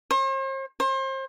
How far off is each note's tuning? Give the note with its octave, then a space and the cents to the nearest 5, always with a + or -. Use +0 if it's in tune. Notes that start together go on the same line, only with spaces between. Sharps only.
C5 +45
C5 +35